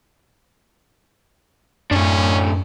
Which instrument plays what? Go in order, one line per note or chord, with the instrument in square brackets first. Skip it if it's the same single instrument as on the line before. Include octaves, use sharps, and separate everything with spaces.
[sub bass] F#2 [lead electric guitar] A2 D4 [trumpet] C#4